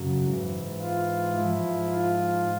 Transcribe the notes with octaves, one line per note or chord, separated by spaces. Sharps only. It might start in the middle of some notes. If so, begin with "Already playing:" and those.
Already playing: F#2 C#3 F#3
G#2 E3
F4
G#2 F3 E4
F4